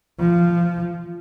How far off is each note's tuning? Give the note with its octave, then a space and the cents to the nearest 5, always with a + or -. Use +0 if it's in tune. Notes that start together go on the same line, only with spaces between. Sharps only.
F3 -15